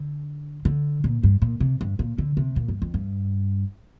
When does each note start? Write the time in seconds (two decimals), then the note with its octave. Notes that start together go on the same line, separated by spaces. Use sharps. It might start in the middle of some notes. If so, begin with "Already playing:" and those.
Already playing: D3
0.65 D3
1.04 A#2
1.23 G2
1.42 A#2
1.60 C3
1.81 G2
1.99 A#2
2.18 D3
2.37 C3
2.56 A#2
2.68 G2
2.82 F2
2.94 G2